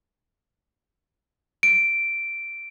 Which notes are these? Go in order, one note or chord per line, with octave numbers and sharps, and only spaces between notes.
D7